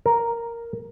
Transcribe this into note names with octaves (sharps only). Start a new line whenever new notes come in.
A#4